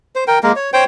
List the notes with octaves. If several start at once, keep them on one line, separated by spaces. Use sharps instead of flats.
C5
A#4 G5
G#3 A#3 A#4
C#5
C5 C#5 G5